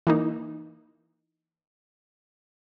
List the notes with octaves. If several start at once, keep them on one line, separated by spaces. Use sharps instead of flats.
E3 A#3 D#4